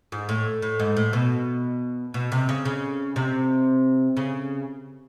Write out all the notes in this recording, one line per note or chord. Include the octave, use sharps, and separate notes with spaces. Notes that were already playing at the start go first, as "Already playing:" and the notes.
G#2
A2
A2
G#2
A2
B2
B2
C3
C#3
C#3
C3
C#3